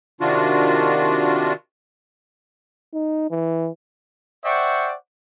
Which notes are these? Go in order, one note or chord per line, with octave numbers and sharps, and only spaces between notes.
C3 D#3 D4 F4 F#4
D#4
E3
C5 D5 E5 F#5 G5 C#6